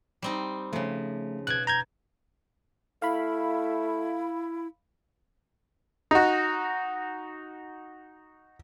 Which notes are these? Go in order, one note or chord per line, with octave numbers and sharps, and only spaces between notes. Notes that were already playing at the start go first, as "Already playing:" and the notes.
G3 C4 D#4
C#3 F3 A3
B2 F#6 G#6
A#5 G6 G#6
A3 E4 F5 B5
D#4 F#4